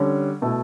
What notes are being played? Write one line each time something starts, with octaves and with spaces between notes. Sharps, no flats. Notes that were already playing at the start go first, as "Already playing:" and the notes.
Already playing: D3 G3 C#4
B2 A3 E4